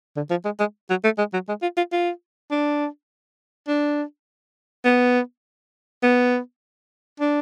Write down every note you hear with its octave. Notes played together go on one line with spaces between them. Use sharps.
D3
F3
G#3
G#3
F#3
A3
G#3
F#3
G#3
F4
F4
F4
D4
D4
B3
B3
D4